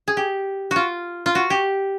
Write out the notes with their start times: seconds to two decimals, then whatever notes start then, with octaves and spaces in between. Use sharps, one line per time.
0.08 G#4
0.17 G4
0.71 F4 F#4
1.26 F4
1.35 F#4
1.50 G4